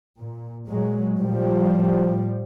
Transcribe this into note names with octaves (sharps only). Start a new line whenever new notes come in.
A#2
A#2 F#3 G#3
A#2 F3 G3
A2